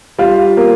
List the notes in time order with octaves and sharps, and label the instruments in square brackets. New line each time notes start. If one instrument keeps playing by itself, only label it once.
[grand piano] G3 F4
A#3